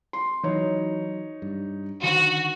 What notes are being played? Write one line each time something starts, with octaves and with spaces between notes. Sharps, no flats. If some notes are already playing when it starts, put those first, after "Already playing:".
C6
E3 F#3 D#4 C#5
G2
D3 D#3 F#4